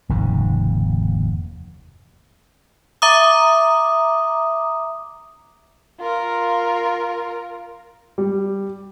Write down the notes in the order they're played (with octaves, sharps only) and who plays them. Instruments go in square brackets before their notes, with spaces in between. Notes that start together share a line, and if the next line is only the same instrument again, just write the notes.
[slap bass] F1 D#2 G#2 C#3
[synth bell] E5 A#5 D6 D#6
[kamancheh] F4 A#4
[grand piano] G3